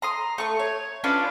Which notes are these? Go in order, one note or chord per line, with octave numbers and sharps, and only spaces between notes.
A#5 C6 D#6
A3 C#6
C#5
C#4 D4 F4 B4